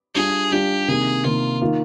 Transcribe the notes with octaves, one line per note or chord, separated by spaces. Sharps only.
G3 D4 F4 G#4
G3 D4 F4 G4
C3 D#3 A#3 G#4
C3 D#3 A#3 F4
D#3 A#3 F4